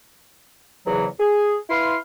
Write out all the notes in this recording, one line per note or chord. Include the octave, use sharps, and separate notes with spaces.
E2 G#2 C#3 E3 F#3
G#4
E4 B4 F5 C6